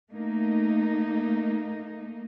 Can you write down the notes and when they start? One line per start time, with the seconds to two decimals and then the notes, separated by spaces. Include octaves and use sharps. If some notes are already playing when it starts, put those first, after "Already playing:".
0.12 A3 A#3 D#4